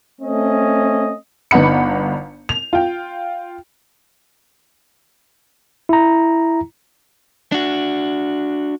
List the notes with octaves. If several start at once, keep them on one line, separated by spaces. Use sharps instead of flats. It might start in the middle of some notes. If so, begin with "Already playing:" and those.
A3 C4 C#4 D#5
G1 B3 D#4 F#5 B5 C#7
F7
F4 G5
E4 A#5
D4 F#4